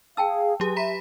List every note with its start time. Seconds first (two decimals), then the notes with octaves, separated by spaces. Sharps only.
0.17 G#4 F5 G5 A5 E6
0.60 F#3 G4 G#4 B4
0.76 E5 A#5 B5 B6